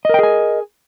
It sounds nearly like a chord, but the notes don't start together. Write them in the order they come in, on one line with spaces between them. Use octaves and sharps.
D#5 A#4 G5 G#4 G#5